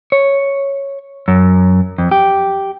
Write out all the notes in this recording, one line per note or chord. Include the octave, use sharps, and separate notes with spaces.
C#5
F#2
F2
G4